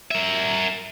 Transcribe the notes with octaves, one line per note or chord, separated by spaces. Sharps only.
A#4 E5